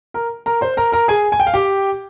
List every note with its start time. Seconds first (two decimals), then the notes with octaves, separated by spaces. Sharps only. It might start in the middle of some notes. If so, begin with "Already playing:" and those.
0.14 A#4 A#5
0.46 A#4 A#5
0.61 C5 C6
0.77 A#4 A#5
0.92 A#4 A#5
1.08 G#4 G#5
1.32 G#5
1.40 G5
1.47 F5
1.54 G4 G5